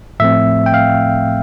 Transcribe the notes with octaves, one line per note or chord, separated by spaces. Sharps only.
A2 F3 A3 C4 E5
G5
F5